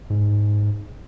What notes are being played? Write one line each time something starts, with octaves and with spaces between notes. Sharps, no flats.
G#2